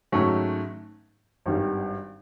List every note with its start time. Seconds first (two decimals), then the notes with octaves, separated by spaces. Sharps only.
0.12 G#2 D#3 F#3 A3 C#4
1.46 G#1 G2 D#3 G3